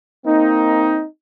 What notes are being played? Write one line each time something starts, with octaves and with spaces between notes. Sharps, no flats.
A#3 C4 D#4